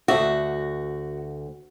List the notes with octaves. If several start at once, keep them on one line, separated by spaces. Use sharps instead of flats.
D2 F#4 E5